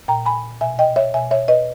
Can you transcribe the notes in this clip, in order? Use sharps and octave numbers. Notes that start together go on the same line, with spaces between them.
A#2 G5 A#5
G#5 B5
B2 E5 G#5
D#5 G5
C#5 E5
B2 E5 G#5
C#5 E5
B4 D#5